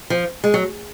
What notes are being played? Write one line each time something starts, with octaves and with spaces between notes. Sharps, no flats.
F3
G#3
F#3